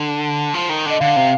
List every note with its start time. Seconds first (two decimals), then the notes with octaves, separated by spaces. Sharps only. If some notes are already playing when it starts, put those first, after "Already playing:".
Already playing: D3
0.54 F3
0.69 D#3
0.86 D3 D#5
1.00 D3 F5
1.16 C3